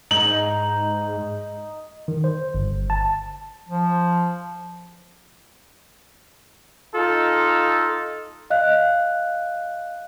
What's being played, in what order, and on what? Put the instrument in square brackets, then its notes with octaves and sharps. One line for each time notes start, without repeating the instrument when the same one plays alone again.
[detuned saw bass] G#2 [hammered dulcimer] D#4 [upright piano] F#7
[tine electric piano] D#3
C5
G1
A5
[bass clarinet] F3
[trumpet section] D#4 F4 A4
[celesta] D#5 F5 F#6